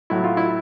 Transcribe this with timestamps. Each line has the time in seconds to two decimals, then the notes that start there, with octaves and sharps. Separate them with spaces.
0.10 A2 F#3 E4
0.24 F4
0.37 E4